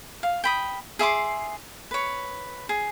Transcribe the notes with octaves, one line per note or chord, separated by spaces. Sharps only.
F5
G5 B5 D#6
G#4 E5 C6 D6
B4 C#5
G#4